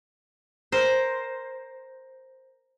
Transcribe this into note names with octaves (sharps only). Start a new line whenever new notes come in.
A#4 C5